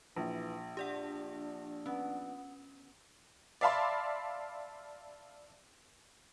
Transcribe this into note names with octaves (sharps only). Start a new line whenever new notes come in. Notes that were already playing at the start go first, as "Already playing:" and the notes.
A#1 E3
D4 G4 D5 F#5
B3 C#4
D5 E5 F5 A5 B5 C6